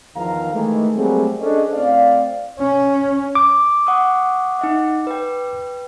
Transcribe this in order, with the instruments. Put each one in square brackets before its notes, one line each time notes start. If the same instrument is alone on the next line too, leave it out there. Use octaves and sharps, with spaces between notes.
[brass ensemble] E2 D#3 F3 F5 A#5
D#3 E3 G#3 A3
F#3 G3 A3 A#3 C4 G#4
C#4 D4 G#4 A4 C5 D#5
A2 C4 D5 F5
[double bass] C#4
[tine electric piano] D6
[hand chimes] F#5 C#6 D#6
D#4 E5 F#5
B4 G5